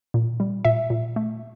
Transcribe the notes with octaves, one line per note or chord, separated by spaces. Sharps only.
A#2
G3
A#2 E5
A#2
A3